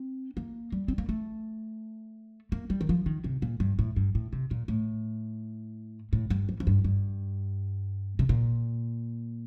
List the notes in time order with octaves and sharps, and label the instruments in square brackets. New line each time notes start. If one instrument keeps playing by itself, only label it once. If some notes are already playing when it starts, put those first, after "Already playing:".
Already playing: [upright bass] C4
A#3
G3
C4
A#3
A3
A#3
G3
D#3
F3
D#3
C3
A#2
G2
A2
G2
A2
C3
A#2
A2
A2
G2
F2
F2
G2
G2
C3
A#2